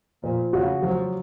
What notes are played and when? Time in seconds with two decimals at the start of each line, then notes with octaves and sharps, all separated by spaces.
0.23 A#2 F3
0.53 C#3 F#4
0.82 F3 F#3